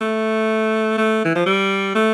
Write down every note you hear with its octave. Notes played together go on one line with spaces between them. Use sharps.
A3
A3
E3
F3
G3
A3